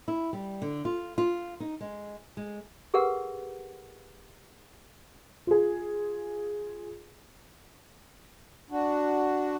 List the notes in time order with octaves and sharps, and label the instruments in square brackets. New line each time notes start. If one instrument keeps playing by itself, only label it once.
[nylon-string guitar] E4
G3
D3
F4
F4
D#4
G#3
G#3
[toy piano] G4 G#4 A#4 B4 F#5
[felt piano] F4 G#4
[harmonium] D4 F#4